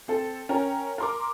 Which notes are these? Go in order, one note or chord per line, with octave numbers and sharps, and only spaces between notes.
C4 A4
C#4 A#4 G5
A#4 C6 D6